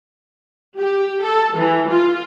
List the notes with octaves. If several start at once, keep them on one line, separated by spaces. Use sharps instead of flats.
G4
A4
E3
F4